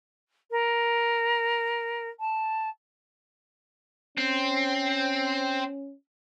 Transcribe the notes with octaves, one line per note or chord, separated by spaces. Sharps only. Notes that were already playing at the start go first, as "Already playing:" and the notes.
A#4
A5
C4 C#4